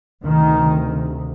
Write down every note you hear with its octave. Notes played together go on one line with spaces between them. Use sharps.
D2 C3 D#3